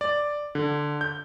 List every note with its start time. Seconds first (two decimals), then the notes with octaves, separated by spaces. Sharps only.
0.01 D5
0.55 D3
1.01 G6